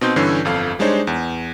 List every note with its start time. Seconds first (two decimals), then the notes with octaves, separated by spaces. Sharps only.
0.01 B2 C4 D#4 C6 G6
0.16 G2 D3 E3 C#4 E6 C7
0.45 G1 F2 A4 F5
0.79 G3 G#3 D4 D#4 C5 C#5
1.07 E2